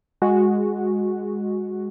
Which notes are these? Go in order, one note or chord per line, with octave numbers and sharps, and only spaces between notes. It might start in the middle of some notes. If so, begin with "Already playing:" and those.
G#3 F#4